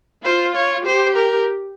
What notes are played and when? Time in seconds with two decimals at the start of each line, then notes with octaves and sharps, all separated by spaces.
0.24 F4 C5
0.55 C#5
0.86 G4 C5
1.16 A#4